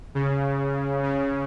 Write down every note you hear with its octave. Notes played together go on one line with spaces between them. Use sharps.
C#3
C#3